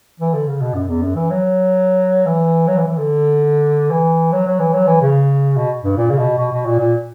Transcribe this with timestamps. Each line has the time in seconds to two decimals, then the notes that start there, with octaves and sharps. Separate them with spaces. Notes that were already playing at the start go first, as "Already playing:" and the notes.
0.20 E3
0.34 D3
0.47 C#3
0.61 B2
0.75 F#2
0.88 E2
1.02 F#2
1.16 E3
1.30 F#3
2.26 E3
2.68 F#3
2.78 E3
2.88 E3
2.98 D3
3.91 E3
4.32 F#3
4.46 F#3
4.60 E3
4.73 F#3
4.87 E3
5.01 C#3
5.56 B2
5.83 G2
5.97 A#2
6.10 C#3
6.18 B2
6.38 B2
6.52 B2
6.66 A#2
6.79 A#2